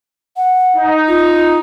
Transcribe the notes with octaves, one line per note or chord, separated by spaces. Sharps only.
F#5
D#4
F4